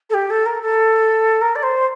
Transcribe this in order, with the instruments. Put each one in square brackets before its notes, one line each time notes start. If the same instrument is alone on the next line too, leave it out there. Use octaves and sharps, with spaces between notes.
[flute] A4
G4
A4
A#4
A4
A#4
D5
C5